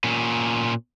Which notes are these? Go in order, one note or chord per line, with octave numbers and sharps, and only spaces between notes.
A#2 C#4